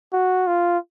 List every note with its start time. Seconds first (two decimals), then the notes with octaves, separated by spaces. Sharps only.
0.13 F#4
0.47 F4